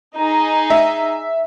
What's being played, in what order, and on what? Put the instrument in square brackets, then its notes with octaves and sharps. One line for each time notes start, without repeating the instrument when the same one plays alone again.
[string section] D#4 G#4
[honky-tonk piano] E5